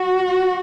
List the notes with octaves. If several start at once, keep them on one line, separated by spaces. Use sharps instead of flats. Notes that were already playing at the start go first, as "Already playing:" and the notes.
Already playing: F#4